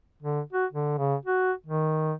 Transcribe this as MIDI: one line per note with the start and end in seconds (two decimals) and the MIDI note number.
0.23 0.41 50
0.53 0.66 66
0.73 0.94 50
0.98 1.15 49
1.26 1.52 66
1.67 2.13 51